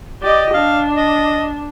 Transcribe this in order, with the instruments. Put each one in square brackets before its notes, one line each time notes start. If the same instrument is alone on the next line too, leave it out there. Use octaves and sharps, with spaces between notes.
[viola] G4 D#5 [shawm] D5
[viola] D4 [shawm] F5
[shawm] D#5